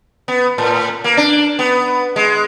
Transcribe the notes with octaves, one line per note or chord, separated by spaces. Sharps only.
B3
A2
A#3
D4
B3
G#3